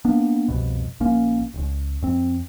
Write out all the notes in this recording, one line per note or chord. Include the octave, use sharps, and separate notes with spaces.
A#3 B3 D4
C2 F2 B2
A#1 A#2 A#3 C#4
E1 C#2
F2 C4